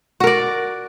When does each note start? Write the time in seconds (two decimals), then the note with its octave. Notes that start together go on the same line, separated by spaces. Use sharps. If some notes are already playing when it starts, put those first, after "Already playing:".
0.20 F#4
0.24 A#4
0.27 D5